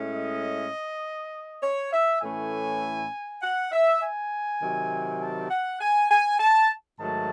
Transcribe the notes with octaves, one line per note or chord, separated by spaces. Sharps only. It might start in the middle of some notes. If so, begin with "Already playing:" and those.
Already playing: A2 G#3 C#4 E4
D#5
C#5
E5
A2 E3 A3 C#4 E4 G#5
F#5
E5
G#5
C3 D#3 F#3
A5
F#5
G#5
G#5
A5
G#2 D#3 F#3 A3 A5